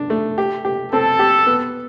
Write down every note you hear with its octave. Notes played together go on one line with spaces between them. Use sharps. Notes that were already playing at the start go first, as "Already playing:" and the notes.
Already playing: D4
A3
G4
G4
C4 A4
G4
B3